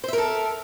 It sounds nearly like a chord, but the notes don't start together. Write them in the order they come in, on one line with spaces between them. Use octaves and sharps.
C5 E5 A#4 A4